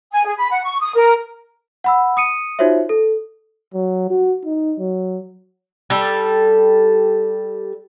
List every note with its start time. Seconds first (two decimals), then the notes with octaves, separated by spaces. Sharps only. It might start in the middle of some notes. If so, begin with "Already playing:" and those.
0.12 G#5
0.24 G#4
0.36 B5
0.50 F#5
0.63 C#6
0.80 D#6
0.94 A#4
1.84 F#5 B5 E6
2.17 D#6 C#7 D#7
2.59 D#4 F4 F#4 C5 C#5 E5
2.89 A4
3.74 F#3
4.10 F#4
4.45 D#4
4.79 F#3
5.90 G3 A4